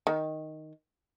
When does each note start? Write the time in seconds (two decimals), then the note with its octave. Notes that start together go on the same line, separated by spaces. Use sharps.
0.07 D#3